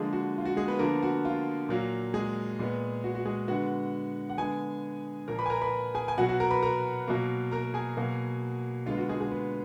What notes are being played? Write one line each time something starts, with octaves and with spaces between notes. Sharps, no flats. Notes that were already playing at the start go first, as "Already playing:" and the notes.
Already playing: D3 F3 G#3 A#3 G#4
F#4
F4
F#4
G#3 G#4
B3 B4
D3 F3 A#3 B3 A#4
F#4
F4
A#2 F#3 A#3
G#3 G#4
A#2 G#3 B3
F#4
F#4
G#3 G#4
D3 G#3 B3 F#4 F#5
F#5
D3 G#3 B3 G#4 G#5
A#2 F3 A#3 A#4 A#5
B4 B5
G#5
A#4 A#5
B4 B5
G#4 G#5
G#5
B2 F#3 B3 F#4 F#5
F#4 F#5
A#4 A#5
B4 B5
A#4 A#5
B2 F#3 A#3
A#4 A#5
G#4 G#5
B2 F#3 A#3
D3 G#3 B3 F4 F5
F#4
G#3 G#4
G#3 G#4
B3 B4